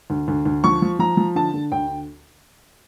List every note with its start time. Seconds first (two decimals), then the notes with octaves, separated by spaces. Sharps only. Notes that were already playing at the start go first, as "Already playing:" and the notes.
0.10 D2
0.28 D2
0.45 D2
0.64 F3 C#6
0.82 F3
0.99 F3 A#5
1.17 F3
1.35 D3 A5
1.54 D3
1.72 D2 G5